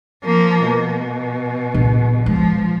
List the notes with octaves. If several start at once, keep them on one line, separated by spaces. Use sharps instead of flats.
F3 A#3
B2
A#1
F3 G#3